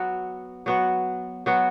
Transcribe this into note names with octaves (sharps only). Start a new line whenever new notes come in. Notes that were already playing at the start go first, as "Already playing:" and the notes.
Already playing: F#3 B3 F#4
F#3 B3 F#4
F#3 B3 F#4